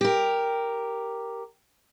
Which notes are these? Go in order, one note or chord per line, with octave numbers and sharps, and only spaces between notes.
G4 A#4